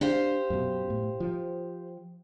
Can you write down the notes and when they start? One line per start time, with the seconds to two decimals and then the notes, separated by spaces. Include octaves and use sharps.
0.01 D4 G4 C5 F5
0.50 F#2 B2
0.90 A2
1.20 F3